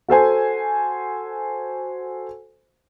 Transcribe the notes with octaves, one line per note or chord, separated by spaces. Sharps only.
F#4 A4 C5 G#5